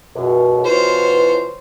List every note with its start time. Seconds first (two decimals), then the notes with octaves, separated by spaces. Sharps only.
0.16 C#2 F#2 B2
0.64 B2 E3 F4 C5 C#5